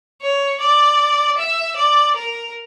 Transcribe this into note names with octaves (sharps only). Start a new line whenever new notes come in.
C#5
D5
E5
D5
A#4